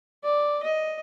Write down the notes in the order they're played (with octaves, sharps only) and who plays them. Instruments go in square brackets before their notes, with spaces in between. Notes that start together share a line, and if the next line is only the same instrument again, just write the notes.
[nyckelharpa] D5
D#5